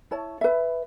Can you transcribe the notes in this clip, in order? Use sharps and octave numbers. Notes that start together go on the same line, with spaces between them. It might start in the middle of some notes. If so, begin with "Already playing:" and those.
E4 C#5 A5
B4 E5